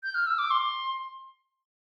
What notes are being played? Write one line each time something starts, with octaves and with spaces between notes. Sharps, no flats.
G6
F6
E6
D6
C6